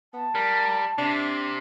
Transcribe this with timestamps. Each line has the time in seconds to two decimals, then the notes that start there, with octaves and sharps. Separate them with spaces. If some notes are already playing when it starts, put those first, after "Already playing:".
0.14 B3 A5
0.35 G3 A#4
0.98 C3 D4